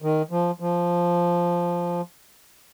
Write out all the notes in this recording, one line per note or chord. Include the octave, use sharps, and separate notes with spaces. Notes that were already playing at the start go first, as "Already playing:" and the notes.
D#3
F3
F3